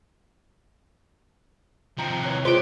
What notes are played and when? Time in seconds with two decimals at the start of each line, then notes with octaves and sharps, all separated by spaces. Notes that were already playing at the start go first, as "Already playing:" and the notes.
1.98 C3 D#3 F3 G5 A#5
2.23 E3 C#5 F#6
2.45 G#3 F4 G4 C5 D7